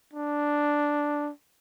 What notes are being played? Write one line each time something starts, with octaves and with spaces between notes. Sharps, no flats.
D4